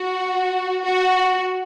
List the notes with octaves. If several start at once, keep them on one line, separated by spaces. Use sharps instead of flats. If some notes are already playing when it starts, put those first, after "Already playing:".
Already playing: F#4
F#4